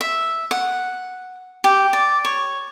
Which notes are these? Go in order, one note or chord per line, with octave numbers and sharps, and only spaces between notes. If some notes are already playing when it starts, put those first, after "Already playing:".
E5
F#5
G4
D5
C#5